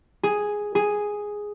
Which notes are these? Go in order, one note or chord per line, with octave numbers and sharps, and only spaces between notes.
G#4
G#4